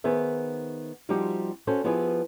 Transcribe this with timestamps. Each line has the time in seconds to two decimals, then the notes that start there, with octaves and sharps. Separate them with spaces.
0.04 D#3 B3 G#4 C5 E5
1.09 F3 G3 C4 D#4 F#4 G4
1.67 C#4 F#4 A4 C5
1.84 F3 B3 E4 G4 G#4